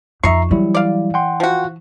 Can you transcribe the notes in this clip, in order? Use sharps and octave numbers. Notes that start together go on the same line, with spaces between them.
F2 D#4 E5 A#5 C#6 C7
E3 F#3 G3 E4
D5 F5
F#5 G5 C6
F3 F#4